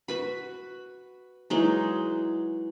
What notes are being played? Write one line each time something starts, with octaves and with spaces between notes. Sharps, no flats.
F#4 B4 B5
E3 F#3 G#3 D#4